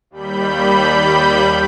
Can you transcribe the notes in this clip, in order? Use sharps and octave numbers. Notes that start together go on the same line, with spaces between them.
D#2 G3 B5 G6